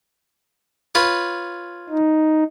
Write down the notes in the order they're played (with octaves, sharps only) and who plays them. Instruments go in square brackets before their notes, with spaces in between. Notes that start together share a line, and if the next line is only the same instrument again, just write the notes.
[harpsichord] F4 B4 C#5
[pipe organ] D#4